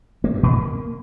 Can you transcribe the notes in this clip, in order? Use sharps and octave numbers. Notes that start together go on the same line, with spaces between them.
A#3
G2
B2
A#3